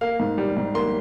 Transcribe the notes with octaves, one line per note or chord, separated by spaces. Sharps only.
A#3 F5
G#2
G3
G#2
A#3 C6